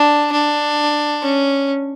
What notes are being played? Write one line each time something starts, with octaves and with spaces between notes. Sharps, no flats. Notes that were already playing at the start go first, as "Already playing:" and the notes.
Already playing: D4
D4
C#4